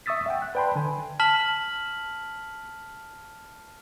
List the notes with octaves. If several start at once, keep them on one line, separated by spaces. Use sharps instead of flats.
E5 C#6 D#6 E6 A6 B6
E5 F#5 G5
F#6
B4 D5 G5 A5 B5 C6
D3 G#5
A5 F6 B6 F#7